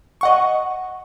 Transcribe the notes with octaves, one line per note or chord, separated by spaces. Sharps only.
D#5 F#5 C#6